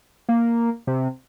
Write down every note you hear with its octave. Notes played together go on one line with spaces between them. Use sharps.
A#3
C3